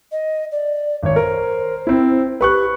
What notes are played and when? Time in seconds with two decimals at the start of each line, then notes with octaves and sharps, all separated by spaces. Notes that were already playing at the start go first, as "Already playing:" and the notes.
0.11 D#5
0.51 D5
1.03 G#1 C#5
1.16 A#4 C5
1.87 C4 E4
2.41 G4 B4 C#6 F#6